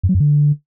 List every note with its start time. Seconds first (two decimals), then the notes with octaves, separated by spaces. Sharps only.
0.03 F#2
0.09 F#3
0.14 F#2
0.20 D3